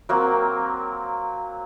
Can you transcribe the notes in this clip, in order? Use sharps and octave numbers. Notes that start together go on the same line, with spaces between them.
F#3 A#3 C4